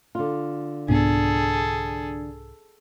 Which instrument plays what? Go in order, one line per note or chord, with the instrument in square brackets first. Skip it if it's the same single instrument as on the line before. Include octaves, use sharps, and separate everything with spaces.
[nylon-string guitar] D3 F4
[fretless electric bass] C2 G#2 B3 [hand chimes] D4 [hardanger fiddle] G#4 A4